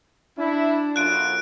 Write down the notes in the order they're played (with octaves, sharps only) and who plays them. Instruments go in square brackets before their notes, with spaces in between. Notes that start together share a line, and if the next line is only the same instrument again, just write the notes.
[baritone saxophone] D4 [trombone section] E4
[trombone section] B1 F#2 F4 [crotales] F#6 D7